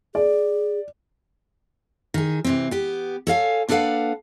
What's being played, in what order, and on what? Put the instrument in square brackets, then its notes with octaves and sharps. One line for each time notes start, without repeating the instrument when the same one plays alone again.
[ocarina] G#4 [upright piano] D5
[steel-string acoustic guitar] D#3 G#4
C3 E3 C4
B3 G4
A4 C#5 F5 G#5
A#3 D4 A4 B4 F5 F#5